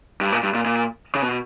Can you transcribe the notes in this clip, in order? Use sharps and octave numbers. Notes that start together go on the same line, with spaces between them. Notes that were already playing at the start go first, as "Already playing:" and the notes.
G2
A#2
G2
A#2
A#2
C#3
B2